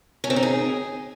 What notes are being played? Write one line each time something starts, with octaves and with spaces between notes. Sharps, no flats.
C#4
C4
D#4
G#4